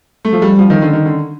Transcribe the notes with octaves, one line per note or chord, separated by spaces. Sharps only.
A3
F3
G3
F3
D#3
D3
D#3
D3